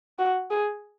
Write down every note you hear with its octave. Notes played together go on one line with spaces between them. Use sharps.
F#4
G#4